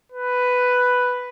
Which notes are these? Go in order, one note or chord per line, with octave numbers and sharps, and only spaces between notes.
B4